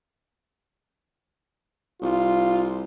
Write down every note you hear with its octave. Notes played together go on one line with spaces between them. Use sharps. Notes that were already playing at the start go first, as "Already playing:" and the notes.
C2 F4